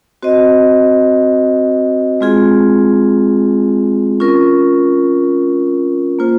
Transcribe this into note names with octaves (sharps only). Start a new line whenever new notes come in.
C4 F#4 C5 D#5
G#3 C4 F4 G#4
C#4 F4 A#4
A#3 F4 C5